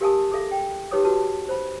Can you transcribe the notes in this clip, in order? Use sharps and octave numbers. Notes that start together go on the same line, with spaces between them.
G4 A#4 F5 G#5 A5 D#6
G#4 A4 E5 F5
G5
D#4 G4 B4 C#5 D6 D#6
F#4 B4 A5
C5 B5